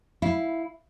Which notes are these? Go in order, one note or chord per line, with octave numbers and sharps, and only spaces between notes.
E4 F5